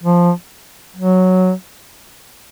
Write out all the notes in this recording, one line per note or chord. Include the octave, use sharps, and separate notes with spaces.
F3
F#3